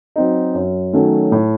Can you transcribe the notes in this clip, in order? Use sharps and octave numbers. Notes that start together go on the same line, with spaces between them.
F#3 C4 D#4
F#2
D#3 F#3 A3 C#4
A2